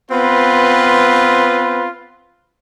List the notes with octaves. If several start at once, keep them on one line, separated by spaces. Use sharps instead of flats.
B3 C4 F4 B4